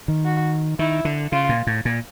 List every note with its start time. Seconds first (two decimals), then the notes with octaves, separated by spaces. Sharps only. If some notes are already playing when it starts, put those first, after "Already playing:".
0.08 D#3
0.25 F#4
0.79 D#3 E4
1.05 D3
1.32 C#3 F4
1.49 A#2
1.67 A2
1.85 A#2